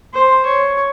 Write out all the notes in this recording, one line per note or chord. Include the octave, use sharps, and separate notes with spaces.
C5
C#5